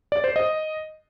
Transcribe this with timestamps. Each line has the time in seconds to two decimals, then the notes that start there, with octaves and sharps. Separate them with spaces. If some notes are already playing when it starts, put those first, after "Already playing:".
0.12 D5
0.24 C5
0.36 D#5